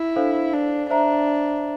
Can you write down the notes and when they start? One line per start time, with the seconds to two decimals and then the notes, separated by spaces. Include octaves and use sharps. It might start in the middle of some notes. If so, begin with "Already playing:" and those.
Already playing: E4
0.16 D4 A4 C5 F5
0.54 D4
0.90 D4 C5 E5 A#5